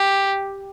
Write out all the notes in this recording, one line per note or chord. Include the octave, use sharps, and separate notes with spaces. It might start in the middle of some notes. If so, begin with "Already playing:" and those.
Already playing: G4